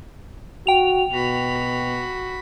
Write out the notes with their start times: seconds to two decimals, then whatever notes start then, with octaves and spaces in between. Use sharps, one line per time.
0.67 F#4 G5 F7
1.11 B2 F#4 B5